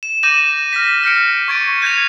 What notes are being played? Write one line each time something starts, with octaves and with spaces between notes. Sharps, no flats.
E7
D6 G6 A#6 D#7 E7 F#7
F6 A#6 B6
F6 G6 C#7 D7
C#6 G#6 A6 D7 D#7
G6 G#6 A#6 C#7 F7